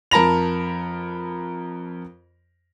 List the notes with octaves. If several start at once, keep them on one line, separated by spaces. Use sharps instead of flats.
F2 A#4 A5 B5 A#6 F7